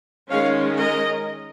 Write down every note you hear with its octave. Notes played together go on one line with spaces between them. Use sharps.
D#3 G#3 C#4 C#5 F5
A#4 D#5